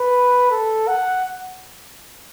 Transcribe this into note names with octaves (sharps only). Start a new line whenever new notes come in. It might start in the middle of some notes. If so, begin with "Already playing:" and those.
Already playing: B4
A4
F#5